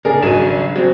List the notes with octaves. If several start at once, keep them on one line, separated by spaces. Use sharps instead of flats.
C#3 C#4 D4 G#4 A#4 D5
G#1 F#3 D#7 E7
F#3 G#3 C4